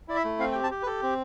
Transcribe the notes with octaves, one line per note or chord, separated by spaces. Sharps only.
E4 D5
E5
A3
C4 F5
G5
G4
A5
G4
B4
G4 A4
C4